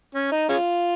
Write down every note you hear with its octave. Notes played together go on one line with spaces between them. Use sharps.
C#4
D#4
G#3 C#4 F4